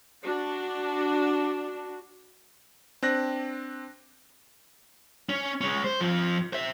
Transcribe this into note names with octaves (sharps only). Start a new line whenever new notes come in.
D4 F#4
C4 D4 F#6 A#6
C#4
G#3 C#4
C5
F2 F3
C5 E5